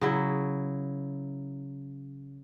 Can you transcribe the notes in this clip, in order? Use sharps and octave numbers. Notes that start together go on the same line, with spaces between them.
C#3 F#3 E4